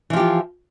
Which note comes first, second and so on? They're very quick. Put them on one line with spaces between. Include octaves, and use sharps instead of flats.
E3 F3 G4 F4